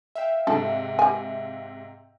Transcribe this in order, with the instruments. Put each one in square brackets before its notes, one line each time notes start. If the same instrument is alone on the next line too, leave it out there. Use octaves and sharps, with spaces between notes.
[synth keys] E5 F5 G5
[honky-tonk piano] G#2 C3 [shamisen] A4
[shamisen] G4 G#5